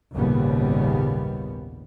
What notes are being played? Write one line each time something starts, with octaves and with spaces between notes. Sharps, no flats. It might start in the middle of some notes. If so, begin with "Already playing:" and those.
G#1 D#2 A#2 C#3 G3 B3